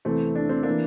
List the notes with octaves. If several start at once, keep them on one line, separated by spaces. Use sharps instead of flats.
E2 C3 E3 A3 C4
D4
C4
A#3 D4
E3